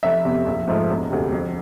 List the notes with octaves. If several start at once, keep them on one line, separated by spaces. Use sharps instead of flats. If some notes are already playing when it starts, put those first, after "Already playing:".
F1 E5
E2 C3
A#1
G#2 F3 A3
E1
D2 C3
F2